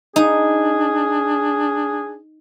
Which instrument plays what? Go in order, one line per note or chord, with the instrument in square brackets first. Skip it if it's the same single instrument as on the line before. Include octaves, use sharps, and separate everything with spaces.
[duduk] D4 [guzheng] D#4 [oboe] G#4